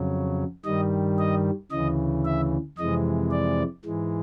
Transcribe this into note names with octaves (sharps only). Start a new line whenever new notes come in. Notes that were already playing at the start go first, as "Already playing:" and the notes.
Already playing: F2 C#3 F#3
G2 D#3 G3 D#5
D#5
D2 C#3 E3 D#5
E5
F2 C3 E3 G#3 D#5
D5
G#2 E3 G#3